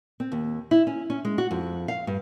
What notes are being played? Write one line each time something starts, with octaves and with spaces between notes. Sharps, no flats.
C4
D#2
E4
C#4
C#4
G#3
F#4
F2
F5
G2